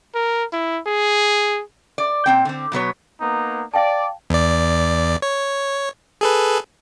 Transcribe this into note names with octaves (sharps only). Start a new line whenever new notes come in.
A#4
E4
G#4
D5
A#2 C4 G5
D3 C4
B2 F#3 B3 C#5
A#3 B3 D#4
D5 F5 G5 A5
E2 D5
C#5
G#4 A4 B4